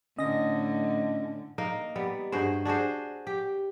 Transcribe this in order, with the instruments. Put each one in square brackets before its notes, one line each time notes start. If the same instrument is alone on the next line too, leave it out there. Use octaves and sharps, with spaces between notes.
[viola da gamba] A2 D3 [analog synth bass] C#4 [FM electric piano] D#5 A#6
[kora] A#3 D#4
G3 B3
G2 F#4 G#4 C5
D4 F#4 G#4 C5
G4